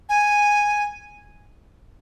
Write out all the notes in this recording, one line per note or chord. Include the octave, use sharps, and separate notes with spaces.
G#5